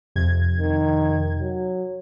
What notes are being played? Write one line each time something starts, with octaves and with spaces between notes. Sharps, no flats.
F2 C3 G#6
D#3
F#3